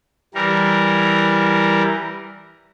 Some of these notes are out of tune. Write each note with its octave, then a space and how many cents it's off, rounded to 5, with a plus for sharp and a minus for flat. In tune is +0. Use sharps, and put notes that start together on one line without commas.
E3 +0 G3 -5 A#4 +0